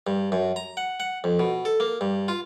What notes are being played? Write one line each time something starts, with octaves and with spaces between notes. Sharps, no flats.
G2
F#2
A#5
F#5
F#5
F2
B2
A4
A#3
G2
F4